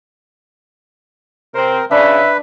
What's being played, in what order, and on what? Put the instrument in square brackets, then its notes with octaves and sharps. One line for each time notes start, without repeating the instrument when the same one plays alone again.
[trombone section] C3 C4 C5 [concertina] A#4
[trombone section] C#3 [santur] D4 [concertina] B4 [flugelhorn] E5